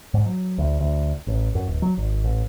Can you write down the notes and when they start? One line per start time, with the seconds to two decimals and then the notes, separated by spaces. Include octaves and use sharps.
0.14 G#2
0.26 F#3
0.58 D2
0.80 D2
1.27 A1
1.55 F#2
1.67 D1
1.82 F#3
1.98 G#1
2.24 A1